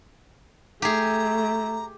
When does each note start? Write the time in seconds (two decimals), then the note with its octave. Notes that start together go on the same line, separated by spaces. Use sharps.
0.82 A3 G4 G#4 A#5